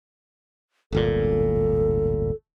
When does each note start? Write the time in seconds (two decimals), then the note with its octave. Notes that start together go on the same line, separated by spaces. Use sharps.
0.92 D1 G1 A#2 A4